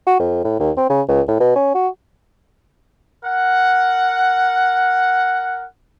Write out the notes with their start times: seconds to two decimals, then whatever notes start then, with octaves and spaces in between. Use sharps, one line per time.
0.07 F#4
0.19 F2
0.44 A2
0.60 D#2
0.77 C4
0.90 C#3
1.09 C#2
1.28 A2
1.40 B2
1.56 C#4
1.75 F#4
3.25 A#4 F#5